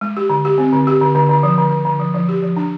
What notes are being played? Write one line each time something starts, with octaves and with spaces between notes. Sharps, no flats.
G#3
G4
D3
G4
C4
D3
G4
D3
D3
D3
F3
D3
D3
D3
F3
F3
G4
F3
D4